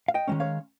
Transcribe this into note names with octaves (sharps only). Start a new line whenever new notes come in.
F5
D#5 G5
D#3 G#3 C#4
C#5 F5